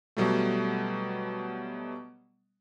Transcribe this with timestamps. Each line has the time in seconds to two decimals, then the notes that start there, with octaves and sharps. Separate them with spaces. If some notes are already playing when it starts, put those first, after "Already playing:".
0.17 B2 F#3 G3 A3